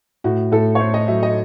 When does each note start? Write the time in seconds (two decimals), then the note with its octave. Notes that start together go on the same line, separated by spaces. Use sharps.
0.24 A2 F#4
0.52 A2 A4
0.75 C#5
0.80 A3 C5
0.94 D#5
1.08 F#3 E5
1.23 D#5